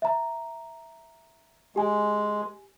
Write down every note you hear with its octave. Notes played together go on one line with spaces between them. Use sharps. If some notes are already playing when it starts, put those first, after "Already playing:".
E5 A#5
G#3 G4 G#5